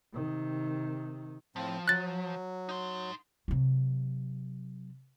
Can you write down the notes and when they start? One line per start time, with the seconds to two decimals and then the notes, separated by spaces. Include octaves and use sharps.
0.13 C3 D#3
1.56 A2 F3 C4
1.88 F#3 F#6 A6
2.69 D#4 C6
3.48 C3 F#3